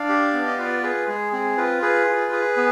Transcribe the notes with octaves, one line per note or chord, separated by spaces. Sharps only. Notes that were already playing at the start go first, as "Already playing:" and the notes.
Already playing: D4 D5 F5
G4
B3
D#5
F4 B4 D5
G#4 B4
G#3 G#4
C4 G#4
F4 B4
G#4 B4
F4
G#4
B3